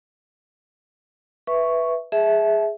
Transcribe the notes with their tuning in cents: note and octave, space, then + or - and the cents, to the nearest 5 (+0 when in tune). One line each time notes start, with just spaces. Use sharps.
B4 +0 E5 +0 C#6 +0
G#4 +0 E5 -10 A5 -35